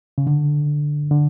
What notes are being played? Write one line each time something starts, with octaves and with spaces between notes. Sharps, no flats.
C#3
D3
D3